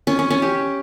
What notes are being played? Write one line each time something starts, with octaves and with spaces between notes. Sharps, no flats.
C#4
C#4
C#4
G4